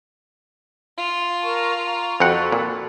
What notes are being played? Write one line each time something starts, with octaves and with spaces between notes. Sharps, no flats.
F4
A#4 A5 C#6
A#5 C#6
F2 C4 F#4 A4 F#5 B5
A#2